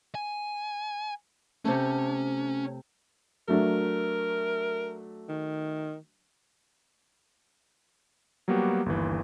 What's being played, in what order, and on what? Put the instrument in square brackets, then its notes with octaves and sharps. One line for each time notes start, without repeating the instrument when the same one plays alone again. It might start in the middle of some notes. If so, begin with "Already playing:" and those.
[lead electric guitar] G#5
[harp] C3 A3 [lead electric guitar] C#4
[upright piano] F#3 A3 D4 [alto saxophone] A#4
[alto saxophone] D#3
[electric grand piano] F#3 G3 A#3 B3 F#4 G4
G1 D#2 E3